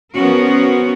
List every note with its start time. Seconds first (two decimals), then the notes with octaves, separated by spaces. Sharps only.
0.13 F3 B3 C#4 F#4 A#4